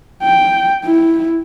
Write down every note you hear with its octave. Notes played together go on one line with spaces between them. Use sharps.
G5
E4